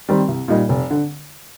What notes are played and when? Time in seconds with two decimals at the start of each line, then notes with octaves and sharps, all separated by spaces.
0.09 D#3 G3 C4
0.28 C2
0.48 A#2 G3 A#3 D#4
0.69 F1
0.90 D3